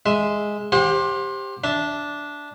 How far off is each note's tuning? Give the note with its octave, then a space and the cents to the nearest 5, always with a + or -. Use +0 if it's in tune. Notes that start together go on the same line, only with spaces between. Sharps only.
G#3 +0 E5 +0
G4 +10 C5 +20 F#5 -35
D4 -10 E5 +0